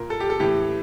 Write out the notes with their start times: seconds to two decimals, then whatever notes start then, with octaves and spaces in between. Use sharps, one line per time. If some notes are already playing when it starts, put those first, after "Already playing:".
Already playing: A#2 A#4
0.10 A4
0.20 G4
0.30 A4
0.40 A2 E3 G4